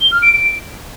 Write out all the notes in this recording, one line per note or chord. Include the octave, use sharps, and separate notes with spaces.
G7
F6
D7
D7